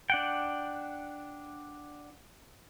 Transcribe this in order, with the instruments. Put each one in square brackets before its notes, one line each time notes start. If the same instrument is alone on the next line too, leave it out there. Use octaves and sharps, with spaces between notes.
[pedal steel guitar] D4 F#5 G5